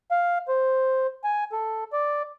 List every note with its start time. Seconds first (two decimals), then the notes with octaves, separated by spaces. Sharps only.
0.11 F5
0.48 C5
1.24 G#5
1.52 A4
1.93 D5